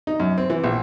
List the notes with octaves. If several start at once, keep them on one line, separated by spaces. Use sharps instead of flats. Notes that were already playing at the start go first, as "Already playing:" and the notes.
D#4
F#2
C4
E3
A#1